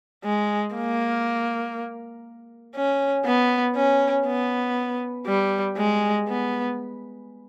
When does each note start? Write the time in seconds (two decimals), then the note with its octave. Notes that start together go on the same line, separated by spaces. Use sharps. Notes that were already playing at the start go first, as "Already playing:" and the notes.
0.24 G#3
0.75 A#3
2.75 C#4
3.25 B3
3.76 C#4
4.27 B3
5.26 G3
5.77 G#3
6.28 B3